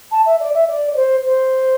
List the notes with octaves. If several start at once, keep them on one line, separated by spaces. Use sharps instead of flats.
A5
E5
D5
E5
D5
D5
C5
C5